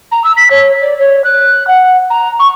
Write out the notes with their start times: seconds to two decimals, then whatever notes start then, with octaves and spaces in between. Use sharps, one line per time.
0.12 A#5
0.24 E6
0.37 B6
0.50 C#5
0.82 D5
0.99 C#5
1.24 F#6
1.67 F#5
2.10 A#5
2.39 C#6